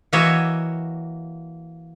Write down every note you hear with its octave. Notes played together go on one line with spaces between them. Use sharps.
E3 A#3 F#4 C#5 D#5 E5